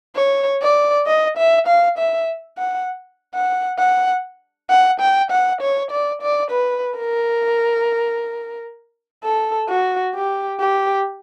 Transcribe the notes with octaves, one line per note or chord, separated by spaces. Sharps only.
C#5
D5
D#5
E5
F5
E5
F#5
F#5
F#5
F#5
G5
F#5
C#5
D5
D5
B4
A#4
A4
F#4
G4
G4